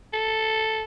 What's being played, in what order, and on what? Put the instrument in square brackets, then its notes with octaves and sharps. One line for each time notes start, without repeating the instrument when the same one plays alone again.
[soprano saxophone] A4